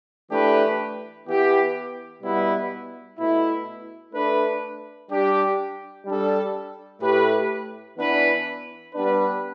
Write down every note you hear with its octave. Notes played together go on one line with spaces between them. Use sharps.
E3 A3 D4 G4 B4
E3 B3 G4
B2 G3 B3 E4 B4
B2 A3 E4
A3 D4 B4
G3 D4 G4
G3 D4 A4
A2 A3 G4 B4
E3 B3 D4 B4
G3 B3 D4 B4